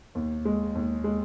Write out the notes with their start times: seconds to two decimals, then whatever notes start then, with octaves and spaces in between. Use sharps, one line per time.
0.15 D#2
0.45 G#3
0.75 D#2
1.04 G#3